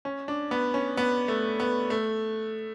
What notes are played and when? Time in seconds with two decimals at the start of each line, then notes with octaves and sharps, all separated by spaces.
0.05 C#4
0.28 D4
0.51 B3
0.74 C#4
0.97 B3
1.28 A3
1.60 B3
1.90 A3